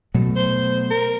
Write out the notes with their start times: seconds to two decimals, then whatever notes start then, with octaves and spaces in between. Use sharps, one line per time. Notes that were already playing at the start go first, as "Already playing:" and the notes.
0.14 B2 F#3 A3
0.36 C5
0.91 A#4